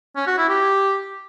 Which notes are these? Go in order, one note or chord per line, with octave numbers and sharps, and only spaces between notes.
C#4
F#4
E4
G4